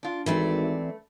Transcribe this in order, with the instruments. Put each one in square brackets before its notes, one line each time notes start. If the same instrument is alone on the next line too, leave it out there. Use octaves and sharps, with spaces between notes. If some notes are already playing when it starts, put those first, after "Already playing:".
[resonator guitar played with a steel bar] D4 F4
[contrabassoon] G#1 [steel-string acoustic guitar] E3 C4 D5 [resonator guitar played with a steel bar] A3 B4